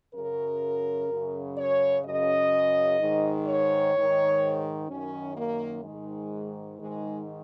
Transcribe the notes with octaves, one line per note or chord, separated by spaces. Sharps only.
F#2 C#3 A#4
F#2 C#3
C#5
F#2 C#3 D#5
G#2 D#3
C#5
G#2 D#3
F#2 D#3 C#4
A#3
G#2 D#3 G#3
G#2 D#3 G#3